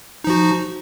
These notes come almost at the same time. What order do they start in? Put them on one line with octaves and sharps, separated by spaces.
D#4 F3 F#4